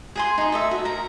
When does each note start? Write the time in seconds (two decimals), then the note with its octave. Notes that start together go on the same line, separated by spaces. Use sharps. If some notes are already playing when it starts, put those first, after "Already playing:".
0.16 G#4 G#5 C6
0.38 D#4 G#4
0.52 A4 D#5 E5
0.71 F#4
0.85 A#4 A#5